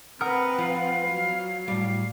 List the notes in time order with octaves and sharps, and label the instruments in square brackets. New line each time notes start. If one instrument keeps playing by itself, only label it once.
[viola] C4 B4 [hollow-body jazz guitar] A#4 [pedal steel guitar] F#5 D#6 F6 [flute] A#5
[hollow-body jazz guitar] F3 [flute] F5
[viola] F#3
[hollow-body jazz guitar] A2 G3 [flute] F5